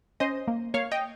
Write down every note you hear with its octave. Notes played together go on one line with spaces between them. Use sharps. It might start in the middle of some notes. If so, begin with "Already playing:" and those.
C#4 C5 D#5
A#3
A#3 C#5 F5
D#5 G5